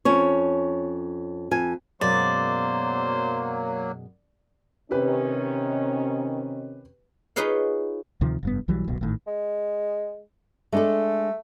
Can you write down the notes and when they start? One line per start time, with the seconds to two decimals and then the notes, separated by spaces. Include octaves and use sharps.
0.05 F2 C#4 C#5
1.51 F2 G#5
2.01 F#2 B2 F#3 G#3 A#3 C5 D5
4.91 C3 D#3 C#4 G4 B4
7.36 D#4 F4 G#4 B4 C#5 F5
8.21 D2 C3 D#3 F3
8.43 F1 G2 B3
8.68 B1 E3 F#3 G3
8.88 D1 B1 B2
9.01 G#1 A2 D#3
9.27 G#3
10.72 G#3 A3 D4 A4